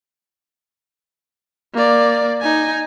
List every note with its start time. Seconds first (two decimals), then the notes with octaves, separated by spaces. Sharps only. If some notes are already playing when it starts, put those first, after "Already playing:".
1.74 A#3 D5
2.42 D#4 G#5